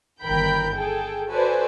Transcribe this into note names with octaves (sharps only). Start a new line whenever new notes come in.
G1 D#3 A#4 G5 B5 G6
G#4 A4 G5
F#4 A4 B4 C5 D5 G#5